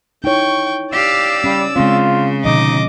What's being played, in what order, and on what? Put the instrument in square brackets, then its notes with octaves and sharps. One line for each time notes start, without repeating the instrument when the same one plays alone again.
[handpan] D#4 E4 C#5 [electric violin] G5 C#6
[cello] G4 F5 [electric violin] D5 E6
[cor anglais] G3 [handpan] C#4
[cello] C#3 [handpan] G#3 C4 [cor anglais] F4
[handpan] B2 D3 F3 [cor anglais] D#4 [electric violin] D#5 D6